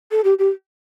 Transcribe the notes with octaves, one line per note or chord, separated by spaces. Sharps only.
A4
G4
G4